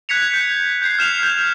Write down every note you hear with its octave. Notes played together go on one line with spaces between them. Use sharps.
F#6 G#6 B6 C#7 F7
G6
G6 G#6 C7
F6 E7 F7
F6 G6 F7